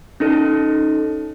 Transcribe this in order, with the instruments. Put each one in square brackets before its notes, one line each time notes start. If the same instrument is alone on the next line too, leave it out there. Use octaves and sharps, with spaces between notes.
[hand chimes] C#4 D#4 A4